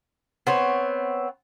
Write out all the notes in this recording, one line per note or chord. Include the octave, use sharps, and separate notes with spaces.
B3 C4 C#5